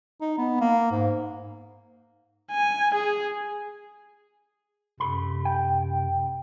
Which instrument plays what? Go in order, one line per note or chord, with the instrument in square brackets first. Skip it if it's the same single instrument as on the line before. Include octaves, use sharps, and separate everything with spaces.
[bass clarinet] D#4
B3
A#3
G#2
[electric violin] G#5
G#4
[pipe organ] F#2 C3 [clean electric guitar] A4 B5
[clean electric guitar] G5